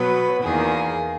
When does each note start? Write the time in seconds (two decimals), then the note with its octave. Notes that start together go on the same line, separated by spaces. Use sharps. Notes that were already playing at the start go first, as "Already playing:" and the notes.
Already playing: B2 F#3 B3 B4
0.43 E2 D#3 A#3 G#4